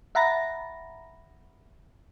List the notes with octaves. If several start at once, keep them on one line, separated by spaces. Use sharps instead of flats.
E5 F#5 A#5 B5 A6 A#6